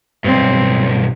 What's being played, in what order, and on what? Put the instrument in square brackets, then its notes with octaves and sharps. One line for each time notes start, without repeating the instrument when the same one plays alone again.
[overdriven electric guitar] B1 G2 [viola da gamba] C4